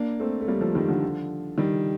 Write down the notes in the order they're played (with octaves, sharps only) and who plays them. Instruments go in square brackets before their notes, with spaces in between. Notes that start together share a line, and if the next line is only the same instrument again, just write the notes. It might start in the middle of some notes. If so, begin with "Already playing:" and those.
Already playing: [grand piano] A#3 D4
A3 C4
A3
G3 A#3
F3 A3
D#3 G3
D3 F3
D#3 G3